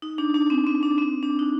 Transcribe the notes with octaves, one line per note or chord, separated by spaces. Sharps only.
D#4
D4
D4
C4
C4
D4
C4
D4
D#4